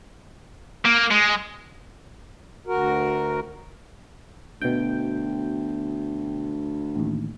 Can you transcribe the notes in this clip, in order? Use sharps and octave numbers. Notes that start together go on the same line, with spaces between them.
A#3
G#3
D2 F#4 A#4
D2 B2 G5
A1 D#2